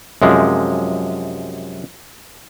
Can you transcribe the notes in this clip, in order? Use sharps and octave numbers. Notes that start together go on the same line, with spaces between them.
F#2 C3 F3 G#3